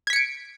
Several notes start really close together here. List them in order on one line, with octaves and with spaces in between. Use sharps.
G#6 B6 C#7 D7